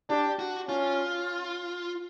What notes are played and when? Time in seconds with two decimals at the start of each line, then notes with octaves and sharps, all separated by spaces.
0.09 D4 G4
0.39 F#4
0.68 C#4 F4